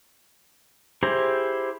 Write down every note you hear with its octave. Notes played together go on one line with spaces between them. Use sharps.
E4 G4 G#4 C5 A#5